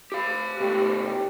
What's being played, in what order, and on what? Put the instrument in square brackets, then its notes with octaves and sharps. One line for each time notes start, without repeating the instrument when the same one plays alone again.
[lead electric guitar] G4 F5
[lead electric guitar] B2 A3 [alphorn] G4